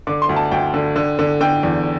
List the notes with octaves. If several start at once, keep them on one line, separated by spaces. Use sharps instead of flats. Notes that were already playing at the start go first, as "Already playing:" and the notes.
D3 D6
C6
D2
A5
D2 G5
D3
D3
D3
D3 G5
E2